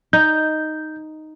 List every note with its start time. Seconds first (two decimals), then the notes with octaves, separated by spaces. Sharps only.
0.13 D#4 G6